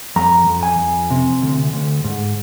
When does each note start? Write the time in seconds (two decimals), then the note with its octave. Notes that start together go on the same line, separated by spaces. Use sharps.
0.16 F2 A#5
0.47 F2
0.63 G#5
0.79 F2
1.10 C3
1.42 D2
1.73 D2
2.04 G#2